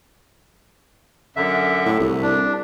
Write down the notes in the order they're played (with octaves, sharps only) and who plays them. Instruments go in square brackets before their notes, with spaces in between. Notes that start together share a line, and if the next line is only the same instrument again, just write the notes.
[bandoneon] F#2 D3 E5
[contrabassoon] A2
C2
[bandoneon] D4